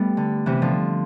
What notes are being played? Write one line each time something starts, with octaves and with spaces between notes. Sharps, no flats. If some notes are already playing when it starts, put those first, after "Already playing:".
Already playing: G3 A3 B3
D3
C3 E3
D3 F3